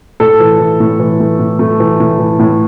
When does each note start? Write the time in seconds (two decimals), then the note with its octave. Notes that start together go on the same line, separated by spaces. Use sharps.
0.20 A2 A4
0.40 E3
0.60 E3
0.80 A2
0.99 E3
1.20 A3
1.39 A2
1.59 A3
1.80 E3
2.00 A2
2.19 E3
2.39 A2